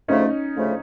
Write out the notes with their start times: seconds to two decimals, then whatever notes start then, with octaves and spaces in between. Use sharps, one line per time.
0.08 D2 C#3 F3 A3 C#4 D#4
0.56 D2 C#3 F3 A3